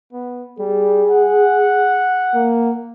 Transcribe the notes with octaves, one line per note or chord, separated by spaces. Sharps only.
B3
G3 G#4
F#5
A#3